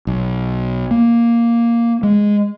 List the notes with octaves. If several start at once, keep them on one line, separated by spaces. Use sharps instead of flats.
B1
A#3
G#3